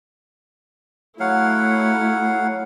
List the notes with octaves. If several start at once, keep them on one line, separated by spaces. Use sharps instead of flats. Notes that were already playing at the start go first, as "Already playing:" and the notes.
F#3 A3 E4 F5 F#5